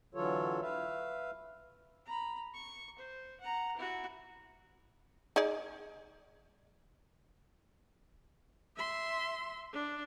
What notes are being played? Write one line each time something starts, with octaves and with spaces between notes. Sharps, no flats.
D3 E3 F#3 F4 A4 C#5
B4 E5 F5
A#5 B5
C#6
C5
F#5 A#5
E4 F#4
D#4 G#4 D5
E5 C6
D4